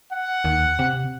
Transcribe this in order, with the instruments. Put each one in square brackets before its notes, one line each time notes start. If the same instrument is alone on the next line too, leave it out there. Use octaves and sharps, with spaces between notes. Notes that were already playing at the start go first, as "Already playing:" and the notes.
[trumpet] F#5
[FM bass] D#2
C3